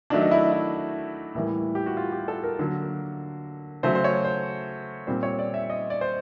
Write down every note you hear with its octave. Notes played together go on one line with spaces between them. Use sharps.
D#3 F#3 A3 D4
D#4
E4
E4
A2 E3 G3 A#3
G4
F#4
F4
G4
A4
A#4
D3 F#3 A#3
C#3 F#3 A3 C5
C5
C#5
C5
A#2 G3 C4 C5
C#5
D5
E5
D#5
D5
C5